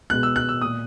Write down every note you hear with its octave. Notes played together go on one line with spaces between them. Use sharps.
B2 G#3 B3 F#6
E6
F#6
E6
A#2 A#3 D#6